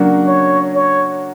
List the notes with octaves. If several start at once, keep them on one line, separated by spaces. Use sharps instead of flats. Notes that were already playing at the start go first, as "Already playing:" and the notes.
Already playing: C#3 F#3 A#3 D4 F#4
C#5
C#5